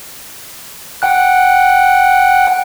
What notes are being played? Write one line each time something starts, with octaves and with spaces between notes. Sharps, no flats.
F#5 G5 F#6